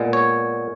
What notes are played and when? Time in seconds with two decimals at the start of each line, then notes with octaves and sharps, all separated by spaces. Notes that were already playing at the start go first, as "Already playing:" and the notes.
Already playing: A#2 G#3 B3
0.13 C#5